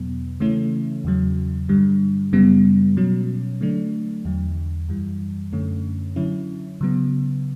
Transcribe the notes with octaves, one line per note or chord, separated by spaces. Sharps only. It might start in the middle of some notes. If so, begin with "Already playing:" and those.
Already playing: E2 B2 F#3 B3
C#3 E3 A3 C#4 E4
E2 C#3 F#3
G2 D3 G3
F#2 C#3 G3 B3
B2 F#3 C#4
D3 F#3 A3 D4
E2 D3 F#3
F#2 E3 G3
F#2 D3 A3 C#4
D3 F#3 C#4 E4
C#3 F#3 B3